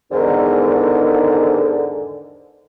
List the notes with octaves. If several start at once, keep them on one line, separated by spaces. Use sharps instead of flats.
E2 G#2 D3 D#3